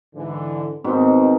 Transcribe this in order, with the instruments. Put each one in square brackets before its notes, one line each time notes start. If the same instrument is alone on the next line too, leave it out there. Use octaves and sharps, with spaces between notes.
[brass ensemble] G#2 D3 E3
[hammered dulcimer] G#2 B2 D#3 [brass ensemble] C4